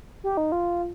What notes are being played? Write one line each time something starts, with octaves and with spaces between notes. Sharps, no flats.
G4
D#4
F4